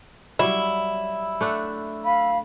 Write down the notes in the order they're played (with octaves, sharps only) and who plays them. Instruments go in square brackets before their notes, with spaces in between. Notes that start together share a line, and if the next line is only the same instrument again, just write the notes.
[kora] F#3 G3 [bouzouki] E4
[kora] A3 D4 F#5
[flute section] F5 B5